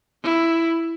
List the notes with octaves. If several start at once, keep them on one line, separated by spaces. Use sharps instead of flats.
E4